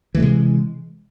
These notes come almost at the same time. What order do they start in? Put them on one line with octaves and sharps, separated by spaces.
E3 A3 C3 G#3